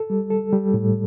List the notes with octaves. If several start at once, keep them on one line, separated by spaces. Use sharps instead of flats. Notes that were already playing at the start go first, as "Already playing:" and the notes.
Already playing: A4
G3
A4
G3
A2